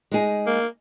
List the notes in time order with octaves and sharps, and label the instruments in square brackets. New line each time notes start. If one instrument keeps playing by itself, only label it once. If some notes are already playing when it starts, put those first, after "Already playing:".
[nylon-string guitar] G#3 D#4 G#4
[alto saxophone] A#3